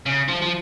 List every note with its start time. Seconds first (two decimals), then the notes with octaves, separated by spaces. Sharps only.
0.06 C#3
0.28 F3
0.41 F3